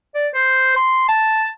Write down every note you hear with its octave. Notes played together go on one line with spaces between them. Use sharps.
D5
C5
C6
A5